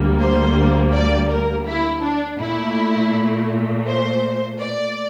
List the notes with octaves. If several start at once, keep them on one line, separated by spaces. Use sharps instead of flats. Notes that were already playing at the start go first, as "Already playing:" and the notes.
Already playing: D2 D3 G3 A#3
C5
D5
A#4
E4
D4
A#2 A3 E4
C5
D5